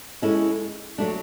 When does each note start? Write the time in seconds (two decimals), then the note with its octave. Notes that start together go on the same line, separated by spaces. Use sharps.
0.22 G#3 C#4 E4 A4
0.98 F#3 A3 D4